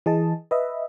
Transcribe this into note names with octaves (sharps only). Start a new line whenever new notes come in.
E3 G#4 D#5 A5
B4 D#5 E5